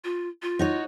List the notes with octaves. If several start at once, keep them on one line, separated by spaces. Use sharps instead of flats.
F4
F4
D#4 F#4 C#5